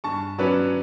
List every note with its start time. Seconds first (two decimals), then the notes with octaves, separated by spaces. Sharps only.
0.04 G2 A5 C#6
0.38 F#3 C#4 B4 D5